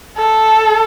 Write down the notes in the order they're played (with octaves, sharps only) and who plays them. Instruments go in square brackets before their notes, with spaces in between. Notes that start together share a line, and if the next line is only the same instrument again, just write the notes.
[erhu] A4